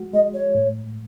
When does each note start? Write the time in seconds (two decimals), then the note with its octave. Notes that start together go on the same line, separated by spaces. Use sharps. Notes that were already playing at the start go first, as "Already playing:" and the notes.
Already playing: G#3 F#4
0.14 G#3 D#5
0.34 C#5
0.55 A2